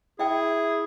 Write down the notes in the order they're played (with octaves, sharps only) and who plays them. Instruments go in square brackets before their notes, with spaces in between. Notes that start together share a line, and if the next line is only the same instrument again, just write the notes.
[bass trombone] E4 [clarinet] G#4 [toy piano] E5 G5